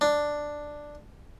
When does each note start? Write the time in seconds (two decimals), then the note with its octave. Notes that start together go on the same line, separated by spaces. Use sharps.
0.01 D4